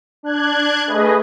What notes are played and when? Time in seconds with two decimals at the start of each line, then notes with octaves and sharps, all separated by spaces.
0.23 D4 F#6 G#6
0.87 A3 G#4 B4 D#5